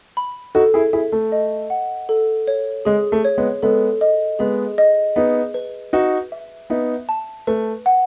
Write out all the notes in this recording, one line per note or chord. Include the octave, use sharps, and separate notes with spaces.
B5
D#4 F#4 A4
E4 G#4
E4 G#4 E5
A3
D#5
F#5
A4
C#5
G#3 G#4
A3
C#5
G#3 B3
G#3 B3 A4
D#5
G#3 B3 G#4
D#5
B3 D#4 G#4
B4
D#4 F#4 B4
E5
B3 D#4 E5
A5
A3 B4
F#5